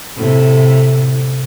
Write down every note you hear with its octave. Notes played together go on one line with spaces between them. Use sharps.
A2 C3